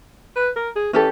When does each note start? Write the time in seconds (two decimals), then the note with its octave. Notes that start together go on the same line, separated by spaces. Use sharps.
0.36 B4
0.56 A#4
0.76 G#4
0.93 E3 C#4 G4 A4